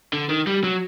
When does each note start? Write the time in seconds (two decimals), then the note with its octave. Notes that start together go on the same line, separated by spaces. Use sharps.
0.13 D3
0.29 D#3
0.47 G3
0.64 F#3